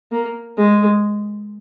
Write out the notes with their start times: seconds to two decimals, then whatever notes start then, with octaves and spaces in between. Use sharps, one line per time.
0.12 A#3
0.58 G#3